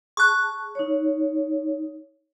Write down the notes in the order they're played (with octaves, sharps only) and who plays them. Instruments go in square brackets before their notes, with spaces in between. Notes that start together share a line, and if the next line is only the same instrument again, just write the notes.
[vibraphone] G#4 A5 [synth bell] C#6 F#6
[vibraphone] D#4 C#5